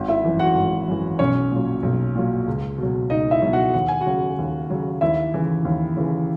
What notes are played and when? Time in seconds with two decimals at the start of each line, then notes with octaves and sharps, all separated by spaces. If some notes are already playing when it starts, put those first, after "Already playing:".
Already playing: G#1
0.08 E4 E5
0.24 F#2 E3
0.39 F#4 F#5
0.55 G#1
0.88 F#2 E3
1.19 B1 C#4 C#5
1.52 A#2 F#3
1.83 B1
2.16 A#2 F#3
2.47 C#2
2.78 B2 F#3
3.10 C#2 D#4 D#5
3.31 E4 E5
3.42 B2 F#3
3.53 F#4 F#5
3.74 D#2 F#5
3.88 G#5
4.01 F#4 F#5
4.06 C#3 F#3
4.38 D#2
4.70 C#3 F#3
5.01 D#2 E4 E5
5.34 C#3 E3
5.65 D#2
5.97 C#3 E3